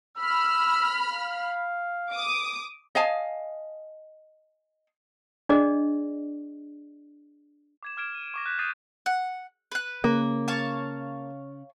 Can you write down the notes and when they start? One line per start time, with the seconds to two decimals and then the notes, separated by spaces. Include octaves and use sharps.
0.18 B5 E6 F6
1.12 F5
2.11 D6 D#6
2.95 D#5 F5 G#5 A5
5.49 D4 G#4 D5 D#5
7.83 D6 G#6 E7
7.97 D6 F6 G#6 D7 E7
8.15 D#7
8.34 C#6 D6 A#6
8.46 F#6 G6 B6
8.59 D#6 G6 A6 C7 D#7 E7
9.06 F#5
9.72 B4 F#6
10.04 C#3 A#3
10.48 C#5 F5 A5